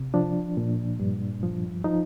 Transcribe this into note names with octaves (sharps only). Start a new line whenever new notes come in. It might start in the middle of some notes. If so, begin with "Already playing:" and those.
Already playing: C3
F3 D4
A#2
G2
F3
F3 D#4